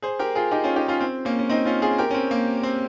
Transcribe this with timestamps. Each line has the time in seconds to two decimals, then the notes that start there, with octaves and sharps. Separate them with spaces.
0.02 G#4 C5
0.19 G4 A#4
0.35 F4 G#4
0.51 D#4 G4
0.64 C#4 F4
0.76 D#4 G4
0.88 C#4 F4
1.00 C4
1.25 A#3 C#4
1.39 C#4
1.49 C4 D#4
1.65 C#4 F4
1.82 F4 G#4
1.98 G4 A#4
2.10 C#4
2.14 C4
2.31 A#3
2.63 C4